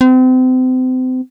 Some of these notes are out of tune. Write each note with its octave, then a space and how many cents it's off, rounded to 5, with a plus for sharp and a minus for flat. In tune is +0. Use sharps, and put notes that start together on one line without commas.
C4 -35